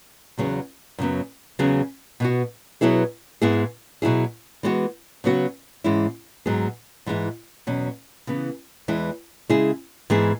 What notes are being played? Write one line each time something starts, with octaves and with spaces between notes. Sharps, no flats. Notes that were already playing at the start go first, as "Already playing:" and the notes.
E2 C#3 F#3 B3 G#4
F#2 C#3 F#3 B3
E2 C#3 F#3 B3 G#4
B2 B3 F#4
B2 F#3 B3 E4 G#4
G#2 G#3 B3 E4 G#4
B2 F#3 E4 G#4
E3 G#3 B3 F#4
C#3 F#3 B3 F#4
G#2 E3 G#3 C#4 E4
G#2 F#3 B3 G#4
G#2 E3 G#3 E4
E2 B2 F#3 C#4
C#3 E3 B3
E2 E3 G#3 E4
C#3 G#3 E4 G#4
G#2 E3 B3 E4 G#4